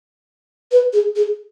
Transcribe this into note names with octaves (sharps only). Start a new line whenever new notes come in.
B4
G#4
G#4